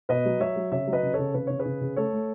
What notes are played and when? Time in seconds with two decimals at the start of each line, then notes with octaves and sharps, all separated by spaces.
0.09 B2 B4 D#5
0.25 F#3
0.40 F#3 C#5 E5
0.56 F#3
0.72 C#3 C#5 E5
0.88 F#3
0.93 B4 D#5
1.03 C#3
1.14 C#3 A4 C#5
1.34 C#3 B4
1.47 C#3 C#5
1.59 G#4 B4
1.66 C#3
1.81 C#3
1.97 A3 A4 C#5
2.13 A3